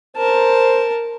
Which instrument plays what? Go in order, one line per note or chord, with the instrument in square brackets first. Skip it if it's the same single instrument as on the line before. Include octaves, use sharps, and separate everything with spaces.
[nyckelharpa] A#4 A5 [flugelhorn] C5